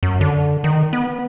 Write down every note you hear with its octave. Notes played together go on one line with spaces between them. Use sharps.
F#2
D3
D#3
B3